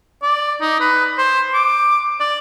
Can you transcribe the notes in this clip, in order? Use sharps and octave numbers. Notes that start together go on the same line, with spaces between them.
D5
D#4
B4
C5
D6
D5